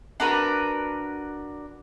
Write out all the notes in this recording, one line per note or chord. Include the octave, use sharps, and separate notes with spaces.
D4 F#4 A#4 B4